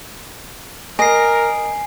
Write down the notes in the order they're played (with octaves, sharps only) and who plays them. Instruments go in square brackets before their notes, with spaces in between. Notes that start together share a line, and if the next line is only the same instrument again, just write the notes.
[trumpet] A#4 [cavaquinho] D#5 [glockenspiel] G#5 C7